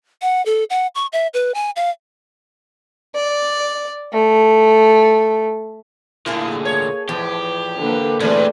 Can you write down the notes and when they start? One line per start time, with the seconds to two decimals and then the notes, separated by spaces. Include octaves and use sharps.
0.22 F#5
0.46 A4
0.70 F#5
0.95 C#6
1.13 E5
1.34 B4
1.54 G#5
1.76 F5
3.15 D5
4.13 A3
6.26 D2 A#2 A#3 E4 G#4 A4
6.65 C#5
7.09 E2 A2 F3 G4
7.80 D3 A#3 B4
8.20 A#2 E3 G3 A3 C4 D4 G#4 B4